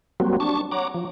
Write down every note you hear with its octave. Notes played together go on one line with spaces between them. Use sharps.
F#3 G3 A#3 C4 F#4
D4 A5 C#6
C#5 F#5 A#5 D6
F3